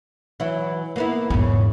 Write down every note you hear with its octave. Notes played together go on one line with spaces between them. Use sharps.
E3 F#3 E4
A#3 B3 E4
E2 G#2 C#3 C#4